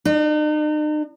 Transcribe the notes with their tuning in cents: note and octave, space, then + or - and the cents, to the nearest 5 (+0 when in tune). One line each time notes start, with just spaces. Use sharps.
D#4 -45